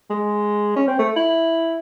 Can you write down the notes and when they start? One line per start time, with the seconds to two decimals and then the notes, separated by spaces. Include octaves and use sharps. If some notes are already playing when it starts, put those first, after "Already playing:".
0.10 G#3
0.76 C#4
0.88 C4
0.99 A3
1.16 E4